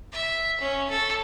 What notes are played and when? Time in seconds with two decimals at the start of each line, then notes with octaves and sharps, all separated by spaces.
0.12 E5
0.61 C#4
0.90 A4